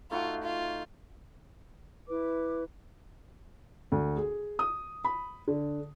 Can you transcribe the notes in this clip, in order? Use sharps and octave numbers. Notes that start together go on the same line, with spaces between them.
A3 D#4 F4 F#4
F4
E4 B4 D6
D2
G#4
D#6
B5
D3